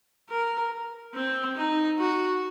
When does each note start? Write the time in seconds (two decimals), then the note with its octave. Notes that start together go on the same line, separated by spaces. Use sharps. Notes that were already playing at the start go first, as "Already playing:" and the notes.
0.30 A#4
1.14 C4
1.56 D#4
1.98 F#4